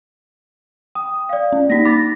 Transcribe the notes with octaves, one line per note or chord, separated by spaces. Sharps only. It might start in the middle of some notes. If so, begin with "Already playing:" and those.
G5 D#6
D5 F5
C#4
A#3 D#4 A#6 B6
B5 D6 A6 A#6